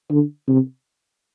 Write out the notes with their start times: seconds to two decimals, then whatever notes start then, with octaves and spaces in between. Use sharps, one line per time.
0.10 D3
0.48 C3